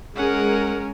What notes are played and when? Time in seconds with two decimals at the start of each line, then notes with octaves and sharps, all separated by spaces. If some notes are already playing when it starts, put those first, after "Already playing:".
0.16 G#3 C#4 G#4 A#4 F#5